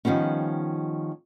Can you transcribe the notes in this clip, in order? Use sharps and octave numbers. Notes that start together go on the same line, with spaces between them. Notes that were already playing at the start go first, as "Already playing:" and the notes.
D#3 F3 G3 B3 C#4